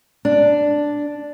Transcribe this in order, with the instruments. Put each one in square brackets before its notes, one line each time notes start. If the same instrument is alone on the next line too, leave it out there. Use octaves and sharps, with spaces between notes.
[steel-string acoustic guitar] D4